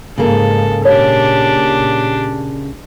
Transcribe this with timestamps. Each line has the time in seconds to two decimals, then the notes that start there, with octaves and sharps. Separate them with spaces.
0.18 G#2 C#3 A#3 A4
0.85 A#2 D4 G4 C#5